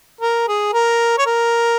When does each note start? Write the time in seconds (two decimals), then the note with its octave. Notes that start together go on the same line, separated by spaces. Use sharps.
0.21 A#4
0.48 G#4
0.74 A#4
1.19 C#5
1.26 A#4